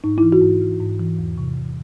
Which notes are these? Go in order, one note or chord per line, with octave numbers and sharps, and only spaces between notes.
G#2 D#4
E3 E4
F#4
G#2
E3
G#2
E3
E2
C3
E3